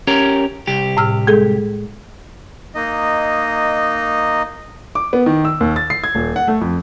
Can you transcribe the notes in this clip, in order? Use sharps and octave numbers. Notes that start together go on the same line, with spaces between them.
C#4 G4 A#4
C2 G4
A2 E6 F6
G#3 G#4 A4
A#3 D#4 D#5
D6
B3
D#3
E6
D#2
A6
C7
G#6
D#1
F#5
A3
F2